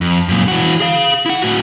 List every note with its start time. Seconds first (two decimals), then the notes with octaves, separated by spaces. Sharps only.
0.01 F2
0.28 F#2 A#2
0.48 E3 F#4
0.80 G#4 F5
1.26 E4 F#5
1.42 A2 F#4